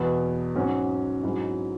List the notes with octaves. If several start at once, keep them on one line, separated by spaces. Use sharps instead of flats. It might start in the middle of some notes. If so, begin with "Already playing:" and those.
Already playing: E2 B2 B3
G#2 F#3 C#4 F#4
G#2 F#3 C#4 E4 G#4